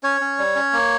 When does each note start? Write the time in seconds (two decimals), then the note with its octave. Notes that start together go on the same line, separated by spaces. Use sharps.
0.03 C#4 C#5
0.21 C#4
0.39 G3
0.55 C#4
0.73 A#3